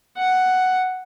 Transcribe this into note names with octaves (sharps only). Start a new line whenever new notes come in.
F#5